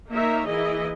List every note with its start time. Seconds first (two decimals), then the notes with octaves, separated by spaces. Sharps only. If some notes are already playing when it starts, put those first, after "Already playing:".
0.11 A#3 D#4 A#4 C#5 E5
0.47 E3 A#3 E4 G#4 D#5